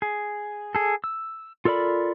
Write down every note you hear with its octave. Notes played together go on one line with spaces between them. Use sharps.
G#4
G#4 A4
E6
F4 A4 A#4 D5 B5